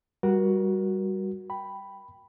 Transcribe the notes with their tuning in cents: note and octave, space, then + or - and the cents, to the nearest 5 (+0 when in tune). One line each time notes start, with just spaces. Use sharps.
G3 +0 F#4 +0 A#4 +30
G5 +0 B5 +0